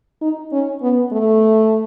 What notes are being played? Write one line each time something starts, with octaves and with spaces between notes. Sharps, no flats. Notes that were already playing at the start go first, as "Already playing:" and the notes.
D#4
C#4
B3
A3